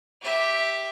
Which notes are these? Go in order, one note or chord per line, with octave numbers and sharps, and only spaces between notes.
G4 E5